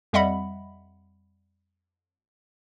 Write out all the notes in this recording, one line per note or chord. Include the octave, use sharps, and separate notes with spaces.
F2 G3 D#5 E5 F#5 B5